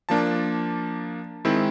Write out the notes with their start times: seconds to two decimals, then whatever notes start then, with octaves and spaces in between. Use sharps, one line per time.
0.09 F3 A#3 D4 A5
1.45 D#3 G#3 C4 E4